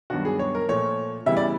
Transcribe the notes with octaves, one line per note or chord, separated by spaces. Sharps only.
G2 D#3 F#3 B3 D4 F#4
G#4
C#5
A#4
A#2 F3 A3 C#5
C#3 E3 G3 B3 E5
D5